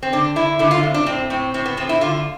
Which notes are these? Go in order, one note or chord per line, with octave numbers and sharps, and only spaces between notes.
C4
D3 D4
D3 E4
D3 E4
F4
F2
D4
A2 C4
A2 C4
A2 C4
B3
F3 C4
E4
D3 F4